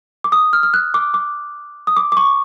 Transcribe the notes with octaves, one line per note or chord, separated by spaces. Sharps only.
D6
D#6
F6
F6
F#6
D6
D6
D#6
D6
D6
C#6